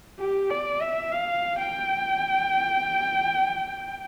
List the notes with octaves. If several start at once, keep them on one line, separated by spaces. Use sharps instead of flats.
G4
D5
E5
F5
G5